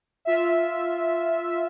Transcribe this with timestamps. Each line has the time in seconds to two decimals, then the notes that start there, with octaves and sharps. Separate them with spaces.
0.25 F4 E5